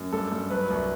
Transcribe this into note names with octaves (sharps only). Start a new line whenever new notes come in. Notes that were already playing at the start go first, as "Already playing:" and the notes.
Already playing: F#2
G2 A4
G2
F#3 B4
C2